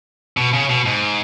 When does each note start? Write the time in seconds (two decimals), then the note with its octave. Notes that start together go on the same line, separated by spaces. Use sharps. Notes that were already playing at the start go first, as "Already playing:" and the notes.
0.37 B2
0.53 C#3
0.69 B2
0.86 G#2